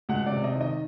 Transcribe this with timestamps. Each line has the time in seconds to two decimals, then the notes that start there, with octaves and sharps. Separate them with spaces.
0.09 C#2 F#5
0.26 D5
0.31 C3
0.44 D#5
0.56 D#3
0.61 D#5